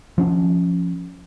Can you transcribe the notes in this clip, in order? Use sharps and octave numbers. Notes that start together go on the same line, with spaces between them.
F3 C#4 D4